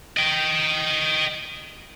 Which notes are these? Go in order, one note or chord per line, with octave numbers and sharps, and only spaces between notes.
D#5 G5